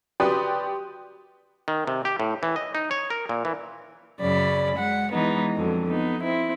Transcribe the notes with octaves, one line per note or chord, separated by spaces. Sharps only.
F#4 G4 B4 D5 C6 D#6
D#3
C3
G4
A2
E3
D#5
D#4
C#5
A#4
A#2
E3
F#2 C#3 D5 B5
G#3 F#5
E3 G#3 B3 D#4
F2 D3 F#3
B3 D#4
C4 E4